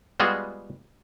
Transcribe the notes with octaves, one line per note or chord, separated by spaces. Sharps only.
G3 G#3 B3 F4 F#4 G#4